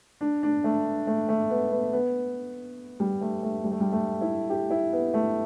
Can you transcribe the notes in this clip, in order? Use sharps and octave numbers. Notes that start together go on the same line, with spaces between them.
D4
D4
A3
A3
A3
B3
B3
B3
G3
A3
A3
G3
A3
G3
A3
E4
G4
E4
B3
A3